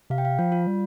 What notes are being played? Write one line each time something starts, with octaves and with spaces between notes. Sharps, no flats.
C3 F5
G5
F5
F3 F4
F4
G3